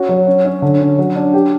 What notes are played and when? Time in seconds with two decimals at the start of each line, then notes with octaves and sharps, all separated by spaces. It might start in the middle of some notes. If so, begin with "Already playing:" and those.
Already playing: C#4 F#4
0.09 F#3
0.27 C#4
0.45 C#4
0.62 D3
0.80 C#4
0.98 F#3
1.16 D4
1.34 G4